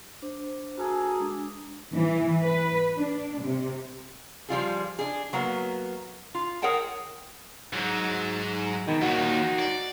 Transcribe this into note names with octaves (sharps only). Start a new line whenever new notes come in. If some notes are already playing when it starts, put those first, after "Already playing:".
D4 C5
A#3 F#4 G#4 A4
G#3 D4
E3
B4
D4
C3
F3 G3 F4 G#4
D4 G#4
F#3 A#3 B3 F#4
F4
G#4 A#4 C#5 F#5 G5 A5
G#2 F#3
B2 D#3
D#2 A#2 A#3 D#4 F#4
D5